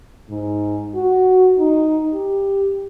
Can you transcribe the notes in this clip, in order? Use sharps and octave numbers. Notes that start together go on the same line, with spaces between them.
G#2
F#4
D#4
G4